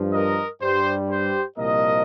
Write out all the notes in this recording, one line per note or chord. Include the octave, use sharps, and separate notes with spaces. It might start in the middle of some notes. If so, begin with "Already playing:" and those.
Already playing: G2 F3
A#4 D#5
G2 G3 G4 C5
G4 C5
C2 A#2 F3 A#4 D#5